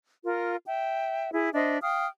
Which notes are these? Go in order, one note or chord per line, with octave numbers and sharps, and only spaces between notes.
F4 A#4
E5 G5
E4 G#4
D4 C5 D#5 E5
F5 G5 D#6 F6